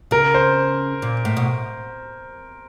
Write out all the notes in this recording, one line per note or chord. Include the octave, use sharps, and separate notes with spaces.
C#3 A#4
C5
A#2
A2
B2